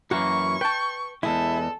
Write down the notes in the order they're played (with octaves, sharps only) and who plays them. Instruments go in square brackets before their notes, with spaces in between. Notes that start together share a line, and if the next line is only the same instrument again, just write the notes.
[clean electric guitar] F#2 E3 A#3 [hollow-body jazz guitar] F#4 [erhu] C#6
[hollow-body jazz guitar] B4 A5 [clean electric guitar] G5
[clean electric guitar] E2 G#2 G#3 [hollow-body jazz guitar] E4 [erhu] A4